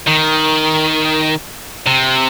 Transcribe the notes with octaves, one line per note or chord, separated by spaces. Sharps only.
D#3
C3